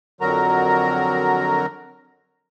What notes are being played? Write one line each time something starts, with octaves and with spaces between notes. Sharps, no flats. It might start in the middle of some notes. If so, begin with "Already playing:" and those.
F2 D3 F#3 F#4 A#4 A#5